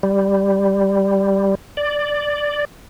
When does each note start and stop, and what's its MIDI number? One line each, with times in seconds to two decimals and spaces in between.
0.03 1.55 55
1.77 2.65 74